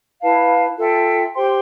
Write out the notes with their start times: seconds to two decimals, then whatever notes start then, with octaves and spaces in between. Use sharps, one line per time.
0.21 E4 B4 F5 A5
0.77 F4 A4 E5 G5
1.34 G4 C5 G5 C6